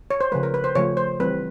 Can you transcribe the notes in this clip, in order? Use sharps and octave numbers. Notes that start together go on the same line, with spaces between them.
C#5
C5
C#3 F3 A3 B4
A#4
B4
C5
C#3 F3 A3 C#5
C5
E3 G3 C4 B4